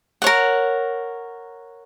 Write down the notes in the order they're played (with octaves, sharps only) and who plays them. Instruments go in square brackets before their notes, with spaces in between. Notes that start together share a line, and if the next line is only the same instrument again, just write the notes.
[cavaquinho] A#4 C#5 F#5